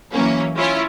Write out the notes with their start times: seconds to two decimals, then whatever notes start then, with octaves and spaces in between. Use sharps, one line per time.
0.13 E3 F#3 A#3 C#4
0.55 C#4 E4 F4 C#5